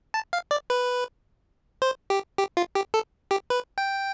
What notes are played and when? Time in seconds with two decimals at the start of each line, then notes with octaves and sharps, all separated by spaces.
0.14 A5
0.33 F5
0.51 D5
0.70 B4
1.82 C5
2.10 G4
2.38 G4
2.57 F4
2.75 G4
2.94 A4
3.31 G4
3.50 B4
3.78 G5